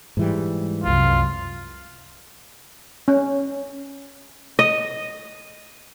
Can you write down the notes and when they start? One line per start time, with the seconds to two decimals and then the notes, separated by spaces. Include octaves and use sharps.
0.17 G#2 E3 G3
0.84 C2 F#2 F4
3.08 C#4
4.59 D#5